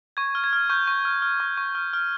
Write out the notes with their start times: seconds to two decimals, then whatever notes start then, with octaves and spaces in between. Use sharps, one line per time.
0.17 C#6 G#6
0.35 F6
0.44 G#6
0.53 F6
0.70 C#6 G6
0.87 C#6
1.05 F6
1.22 F6
1.40 C#6
1.57 C#6
1.75 F6
1.93 F6